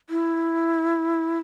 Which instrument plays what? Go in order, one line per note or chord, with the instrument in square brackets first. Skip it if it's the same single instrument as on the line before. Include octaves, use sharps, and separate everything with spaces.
[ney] E4